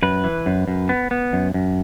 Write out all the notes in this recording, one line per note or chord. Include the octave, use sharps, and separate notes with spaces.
F#2 B4
E3
F#2
F#2
B3
B3
F#2
F#2